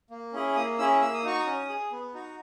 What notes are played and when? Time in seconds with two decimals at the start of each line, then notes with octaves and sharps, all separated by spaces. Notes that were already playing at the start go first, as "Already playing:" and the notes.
0.11 A#3
0.33 C#4 E4 G#4
0.56 A#3 D#6
0.79 C#4 E4 G#4 E6
1.02 A#3 E6
1.14 D#6
1.23 D#4 F#4 C#6
1.39 D#6
1.46 C#4
1.69 G#4
1.92 B3
2.14 D#4 F#4